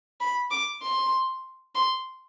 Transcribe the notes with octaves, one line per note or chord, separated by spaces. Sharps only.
B5
D6
C6
C6